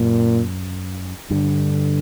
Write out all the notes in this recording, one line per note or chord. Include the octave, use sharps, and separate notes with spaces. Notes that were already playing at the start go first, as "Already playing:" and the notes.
Already playing: F#2 A#2
G2 D3